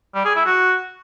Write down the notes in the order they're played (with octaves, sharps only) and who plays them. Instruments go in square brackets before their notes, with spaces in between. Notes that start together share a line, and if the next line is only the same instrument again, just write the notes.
[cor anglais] G3
G#4
E4
F#4